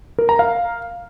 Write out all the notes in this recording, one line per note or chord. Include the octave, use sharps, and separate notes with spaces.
A#4
A#5
F5